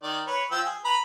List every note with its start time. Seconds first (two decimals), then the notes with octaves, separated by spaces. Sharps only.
0.03 D#3 D5
0.27 B4 C#5
0.51 F3 G5 E6
0.65 G#4
0.85 B4 A#5 B5